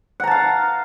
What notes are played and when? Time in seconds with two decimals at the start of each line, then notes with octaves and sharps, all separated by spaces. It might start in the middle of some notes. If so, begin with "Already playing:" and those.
0.20 F#5
0.24 A#5
0.27 A5
0.31 F5